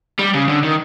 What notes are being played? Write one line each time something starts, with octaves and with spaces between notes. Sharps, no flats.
G3
C#3
D3
D#3